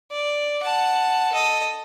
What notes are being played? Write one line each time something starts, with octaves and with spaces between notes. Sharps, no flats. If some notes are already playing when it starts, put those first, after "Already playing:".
D5
F#5 A5
A4 D#5